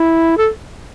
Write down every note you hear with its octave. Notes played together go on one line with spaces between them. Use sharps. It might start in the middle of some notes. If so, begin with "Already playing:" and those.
Already playing: E4
A4